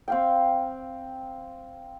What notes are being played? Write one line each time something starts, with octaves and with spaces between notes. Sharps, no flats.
C4 F5 G5